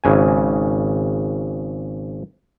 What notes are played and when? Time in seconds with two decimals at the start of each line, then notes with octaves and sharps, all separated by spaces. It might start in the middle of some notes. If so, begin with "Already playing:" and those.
0.04 G#1 C#3 G#5